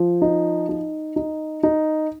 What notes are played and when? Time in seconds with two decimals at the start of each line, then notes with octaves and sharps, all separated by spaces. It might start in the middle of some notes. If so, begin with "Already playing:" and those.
Already playing: F3
0.22 D#4
0.69 D#4
1.16 D#4
1.63 D#4